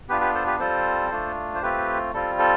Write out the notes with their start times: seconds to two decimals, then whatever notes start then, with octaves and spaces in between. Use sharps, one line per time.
0.09 B3 D4 F4 G4 B4
0.21 G4 B4
0.34 A4 C5
0.47 G4 B4
0.59 G3 C4 F4 A4 C5
1.11 A3 D4 F4
1.55 C5
1.62 A3 C4 F4 G4 B4
2.14 G3 C4 F4 A4
2.39 A4